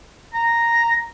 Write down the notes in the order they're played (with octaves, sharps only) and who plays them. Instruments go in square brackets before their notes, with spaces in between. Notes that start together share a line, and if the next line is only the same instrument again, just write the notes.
[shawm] A#5